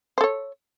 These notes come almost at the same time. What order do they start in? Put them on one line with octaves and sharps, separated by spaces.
C5 A4 C#5